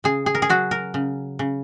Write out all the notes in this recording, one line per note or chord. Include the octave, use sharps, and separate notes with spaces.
C#3 G#4
G#4
A#4
G#4
F#3 F#4
A#4
C#3
C#3